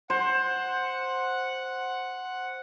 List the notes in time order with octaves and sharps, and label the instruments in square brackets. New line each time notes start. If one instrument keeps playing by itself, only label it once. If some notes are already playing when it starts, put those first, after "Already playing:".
[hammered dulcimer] C5 [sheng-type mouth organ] F#5